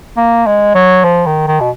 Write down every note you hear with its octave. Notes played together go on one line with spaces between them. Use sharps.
A#3
G#3
F#3
F3
D#3
D#3
B2